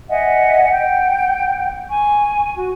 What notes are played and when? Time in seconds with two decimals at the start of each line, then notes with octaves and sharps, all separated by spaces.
0.10 D#5 E5 F#5 G#5
0.71 F#5 G5 G6
1.89 G#5 C#6
2.56 F#4